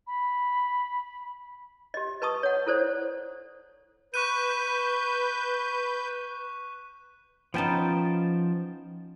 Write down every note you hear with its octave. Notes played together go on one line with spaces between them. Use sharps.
B5
G4 D#5
B4 D#5 A5 C#6 D#6
C#5 F#5
E4 A4 C5 D5
B4 C#6 F#6 G6 D#7
F3 B3 C#4 D#4 G5 A5